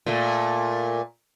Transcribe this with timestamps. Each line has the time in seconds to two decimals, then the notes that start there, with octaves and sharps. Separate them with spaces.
0.06 A#2 A3